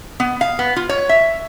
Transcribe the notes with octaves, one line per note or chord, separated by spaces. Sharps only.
B3
F5
B3
F4
C#5
E5